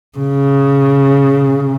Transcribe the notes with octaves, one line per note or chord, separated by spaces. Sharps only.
C#3